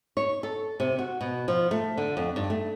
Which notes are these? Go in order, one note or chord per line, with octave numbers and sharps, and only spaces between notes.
C#5
A4
C3
F#4
B2
F3
A3
D3
F2
G2
A3